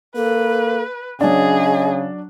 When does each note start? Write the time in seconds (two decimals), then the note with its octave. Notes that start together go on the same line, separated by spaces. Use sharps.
0.16 A#3 A4 B4
1.21 C#3 F#3 D4 G#4 D#5